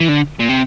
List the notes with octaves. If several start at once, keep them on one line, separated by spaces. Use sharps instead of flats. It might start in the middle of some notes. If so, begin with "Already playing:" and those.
E3
D3
A#2
C3